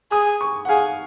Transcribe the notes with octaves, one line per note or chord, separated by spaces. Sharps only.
G#4 D#6
C#6
F#5
G#4 F5